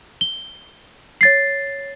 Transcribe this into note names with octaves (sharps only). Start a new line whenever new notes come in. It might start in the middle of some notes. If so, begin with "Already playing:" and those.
G7
C#5 A6 C7